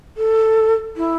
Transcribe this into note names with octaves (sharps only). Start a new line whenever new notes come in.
A4
E4